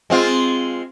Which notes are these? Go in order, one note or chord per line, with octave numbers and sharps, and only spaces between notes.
G#3 C4 F4